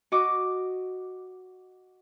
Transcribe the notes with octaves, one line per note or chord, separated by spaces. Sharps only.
F#4 D#5 D6